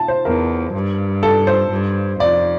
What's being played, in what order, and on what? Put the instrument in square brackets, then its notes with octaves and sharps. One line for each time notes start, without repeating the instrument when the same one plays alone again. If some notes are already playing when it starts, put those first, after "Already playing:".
Already playing: [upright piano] A5
C5
[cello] E2 [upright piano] A#4
[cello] G2
[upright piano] A4
C5
[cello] G2
[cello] F2 [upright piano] D5